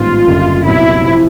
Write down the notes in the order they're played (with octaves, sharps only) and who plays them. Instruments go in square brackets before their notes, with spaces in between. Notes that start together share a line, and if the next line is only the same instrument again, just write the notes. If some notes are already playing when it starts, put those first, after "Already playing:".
Already playing: [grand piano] A1 G#2 D#3 G3 B3 [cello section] F4
[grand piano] F#1 F#2 D3 G3
[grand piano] C2 A#2 F#3 B3 D#4 [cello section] E4
[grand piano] C3 F3